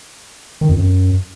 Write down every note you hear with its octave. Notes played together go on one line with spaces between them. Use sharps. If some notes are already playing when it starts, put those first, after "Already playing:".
D#3
F2
F#2